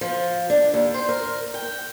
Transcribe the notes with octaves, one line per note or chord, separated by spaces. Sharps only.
F3
D4
D#2
C5
A#4
G5